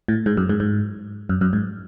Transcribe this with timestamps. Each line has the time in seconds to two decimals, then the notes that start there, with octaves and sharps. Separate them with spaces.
0.08 A2
0.26 G#2
0.37 F#2
0.49 G#2
0.60 G#2
1.29 F#2
1.41 F#2
1.53 G#2